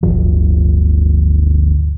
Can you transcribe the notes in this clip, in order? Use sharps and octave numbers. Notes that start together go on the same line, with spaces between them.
D1 G1 F3